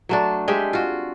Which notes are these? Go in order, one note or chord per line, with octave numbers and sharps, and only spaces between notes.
F#3 A3 D4
G#3 C4 G4 E5
F4 F#4